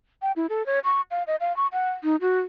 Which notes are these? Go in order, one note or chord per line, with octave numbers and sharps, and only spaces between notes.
G5
E4
A4
C#5
C#6
F5
D#5
F5
C#6
F#5
D#4
F#4